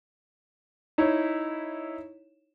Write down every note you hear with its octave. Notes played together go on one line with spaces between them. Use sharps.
D#4 E4 C#5